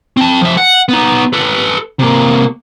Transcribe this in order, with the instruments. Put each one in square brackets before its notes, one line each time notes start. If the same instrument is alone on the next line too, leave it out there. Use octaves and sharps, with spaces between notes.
[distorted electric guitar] C4 A5
F3 E5
F#5
B3 D#4
A4 B4
C3 A#3